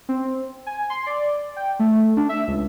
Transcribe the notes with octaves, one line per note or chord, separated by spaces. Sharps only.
C4
G#5
C6
D5
G5
A3
D4
E5
C#2